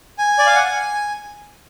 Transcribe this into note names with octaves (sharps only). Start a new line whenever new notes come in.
G#5
D5
F5
F#5
G#5